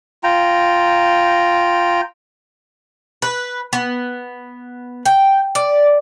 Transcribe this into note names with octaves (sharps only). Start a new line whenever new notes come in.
F4 G5 A#5
B4
B3
G5
D5